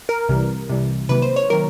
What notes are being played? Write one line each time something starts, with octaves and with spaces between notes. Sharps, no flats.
A#4
C2 C3 E3 G3
C2 C3 E3 G3
C3 D#3 F#3 A#3 B4
C5
C#5
C3 D#3 F#3 A#3 A#4